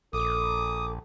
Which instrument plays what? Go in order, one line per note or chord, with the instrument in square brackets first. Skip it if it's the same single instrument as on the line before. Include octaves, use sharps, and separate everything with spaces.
[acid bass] A#1 [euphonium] A4 [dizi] D6 [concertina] D#6